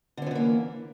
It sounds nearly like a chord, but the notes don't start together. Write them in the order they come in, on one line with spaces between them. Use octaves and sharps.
D3 C#4 F3 E3 A#3